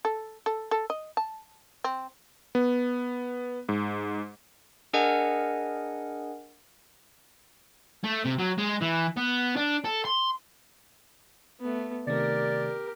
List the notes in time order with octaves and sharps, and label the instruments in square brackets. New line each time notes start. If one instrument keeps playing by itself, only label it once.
[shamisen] A4
A4
A4
D#5
A5
C4
[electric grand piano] B3
G#2
[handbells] D4 G#4 A#4 D#5 F#5 G#5
[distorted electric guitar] A3
C3
F#3
G#3
E3
B3
D4
A4
C6
[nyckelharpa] A3 B3
[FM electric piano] C3 D#3 A3 [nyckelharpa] G4 A#4 [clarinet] D5